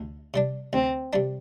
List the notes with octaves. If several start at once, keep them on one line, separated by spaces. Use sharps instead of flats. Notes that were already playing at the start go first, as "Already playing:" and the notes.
Already playing: D2
C3 G3 D4
D2 C4
C3 G3 D4